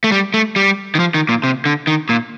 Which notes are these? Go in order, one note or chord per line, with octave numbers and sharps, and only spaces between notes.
A3
G3
A3
G3
D#3
F3
D#3
A#2
C3
D3
D#3
A#2